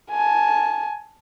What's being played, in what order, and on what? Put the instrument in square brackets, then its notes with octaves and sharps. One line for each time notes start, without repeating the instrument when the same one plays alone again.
[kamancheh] G#5 A5